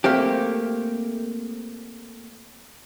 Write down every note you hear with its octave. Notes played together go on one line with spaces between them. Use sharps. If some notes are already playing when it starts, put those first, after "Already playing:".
A3 A#3 C4 G4